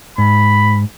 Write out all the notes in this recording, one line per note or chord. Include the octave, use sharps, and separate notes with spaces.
G#2 B5